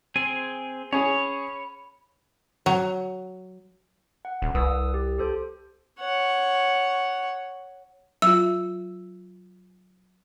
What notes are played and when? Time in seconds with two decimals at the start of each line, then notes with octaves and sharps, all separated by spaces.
0.16 C4 G#4 G#5
0.93 C#4 G#4 C#5 B5
2.66 F#3
4.25 F#5
4.42 D#1
4.55 C2 B4 D#6 E6
4.94 G4
5.18 G4 A4 C5
6.00 C#5 F#5
8.22 F#3 F4 E6